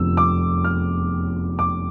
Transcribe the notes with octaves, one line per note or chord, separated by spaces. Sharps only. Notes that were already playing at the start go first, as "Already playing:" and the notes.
Already playing: F1 E2 D3 F3 E6
D6
F6
D6